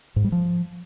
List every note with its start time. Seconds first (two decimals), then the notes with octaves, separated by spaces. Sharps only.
0.16 G#2
0.24 G3
0.32 F3